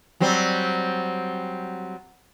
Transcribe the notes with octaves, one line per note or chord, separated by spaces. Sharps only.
F#3 G3 C4